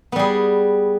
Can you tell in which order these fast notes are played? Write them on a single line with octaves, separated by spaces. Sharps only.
B3 G3 G#4